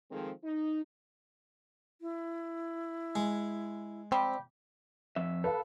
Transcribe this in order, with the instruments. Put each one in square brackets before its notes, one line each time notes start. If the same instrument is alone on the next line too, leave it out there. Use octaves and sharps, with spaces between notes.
[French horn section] D#3 F3 G#3 C4 G#4 A4
D#4
[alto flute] E4
[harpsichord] G#3
[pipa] F3 G3 G4 [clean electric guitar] C4
[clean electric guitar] F2 E5
[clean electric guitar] A4 [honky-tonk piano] B4 F5